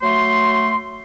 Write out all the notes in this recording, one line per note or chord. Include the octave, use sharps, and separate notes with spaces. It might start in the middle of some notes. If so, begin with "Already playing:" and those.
F#3 A3 C6